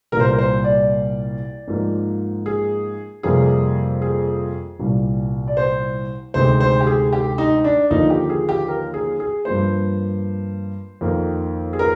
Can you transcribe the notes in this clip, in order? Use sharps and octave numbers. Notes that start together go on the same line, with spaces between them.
C2 A#2 G3 A#3 A#4
C5
A#4
C5
D5
G#2 F3 A#3
G#4
F2 C3 G3 A#3 G#4
G#4
C2 A#2 G3 A#3
D5
C5
D2 C3 D#3 G#3 C5
C5
G4
G#4
G4
D#4
D4
D#2 D3 F3 A#3 D#4
G4
G#4
G4
A#4
G#4
G#4
G2 F3 A#3 C5
F2 D#3 A#3
G#4
A#4